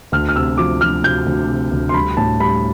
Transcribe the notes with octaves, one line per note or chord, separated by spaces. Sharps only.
D2 F6
F6
C3 E6
F3 D6
F3 F6
C3 G6
D2
C3
D2
C6
G3 B5
A2 A5
G3 B5